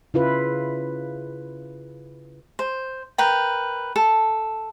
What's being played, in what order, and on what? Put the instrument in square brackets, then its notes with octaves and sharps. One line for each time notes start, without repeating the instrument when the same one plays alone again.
[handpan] C#3 E4 F4 B4
[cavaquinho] C5
A#4 B4 G5
A4